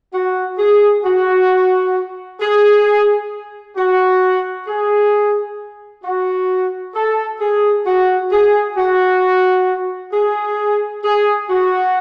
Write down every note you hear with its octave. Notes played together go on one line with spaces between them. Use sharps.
F#4
G#4
F#4
G#4
F#4
G#4
F#4
A4
G#4
F#4
G#4
F#4
G#4
G#4
F#4